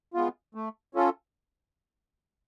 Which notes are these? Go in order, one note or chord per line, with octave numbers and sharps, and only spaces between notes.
G#3 B3 F4
A3
C#4 F4 A4